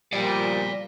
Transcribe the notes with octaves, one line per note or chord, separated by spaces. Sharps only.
A#2 F3 G3 D5 F5